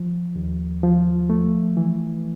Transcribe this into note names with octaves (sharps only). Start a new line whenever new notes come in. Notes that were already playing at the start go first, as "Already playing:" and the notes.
Already playing: F3
D#2
F3
A3
E3